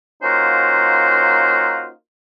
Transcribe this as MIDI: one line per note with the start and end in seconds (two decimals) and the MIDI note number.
0.22 1.90 58
0.22 1.90 61
0.22 1.90 63
0.22 1.90 65
0.22 1.90 66
0.22 1.90 72